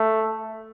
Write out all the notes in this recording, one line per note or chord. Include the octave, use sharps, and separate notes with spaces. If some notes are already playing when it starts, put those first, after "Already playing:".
Already playing: A3